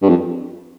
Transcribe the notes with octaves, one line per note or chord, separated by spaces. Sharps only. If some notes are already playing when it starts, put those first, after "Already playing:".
G2
F2